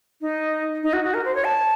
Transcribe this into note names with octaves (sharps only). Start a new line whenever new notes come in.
D#4
D#4
F#4
F#4
A#4
C5
C#5
A5